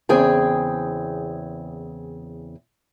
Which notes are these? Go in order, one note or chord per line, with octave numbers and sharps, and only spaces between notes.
E2 C#3 C4 G#4 G5 G#5